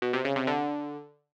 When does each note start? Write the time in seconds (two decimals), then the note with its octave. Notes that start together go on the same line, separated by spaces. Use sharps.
0.02 B2
0.13 C3
0.25 C#3
0.36 C3
0.47 D3